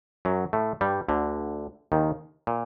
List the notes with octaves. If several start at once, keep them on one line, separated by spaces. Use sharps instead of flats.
F#2 F#3
A2 A3
G2 G3
D2 D3
D#2 D#3
A#2